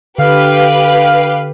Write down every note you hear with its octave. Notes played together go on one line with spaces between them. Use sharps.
D3 G4 B4 F5